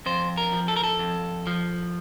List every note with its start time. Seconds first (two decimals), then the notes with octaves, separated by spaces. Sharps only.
0.06 F2 C5
0.38 A#4
0.53 F3
0.68 A4
0.76 A#4
0.84 A4
0.99 F2
1.47 F3